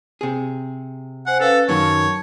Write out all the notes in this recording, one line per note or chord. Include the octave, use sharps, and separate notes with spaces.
C3 G#4
C5 F#5 G#5
C#4 A4 B4 F5
F#2 D#3 C#5 A5